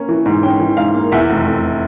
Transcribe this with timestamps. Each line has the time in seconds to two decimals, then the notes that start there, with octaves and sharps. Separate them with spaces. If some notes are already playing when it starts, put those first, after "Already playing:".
Already playing: A#3 C#4
0.09 E3
0.26 G#2
0.43 C#4 G5
0.60 E3
0.77 G#2 F5
0.95 A#3
1.12 E2 E5
1.30 F1
1.47 F1